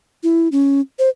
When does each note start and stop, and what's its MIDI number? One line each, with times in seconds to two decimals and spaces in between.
0.23 0.48 64
0.52 0.81 61
0.99 1.09 72